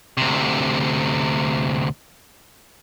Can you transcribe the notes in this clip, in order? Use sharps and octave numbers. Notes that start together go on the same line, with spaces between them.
D2 C3